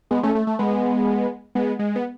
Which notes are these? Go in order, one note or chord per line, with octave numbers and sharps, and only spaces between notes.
G#3 B3
A3 C#4
A3
A3
G#3 B3
G#3 B3
G#3
B3